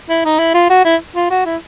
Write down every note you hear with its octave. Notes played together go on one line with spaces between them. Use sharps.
E4
D#4
E4
F4
F#4
E4
F4
F#4
E4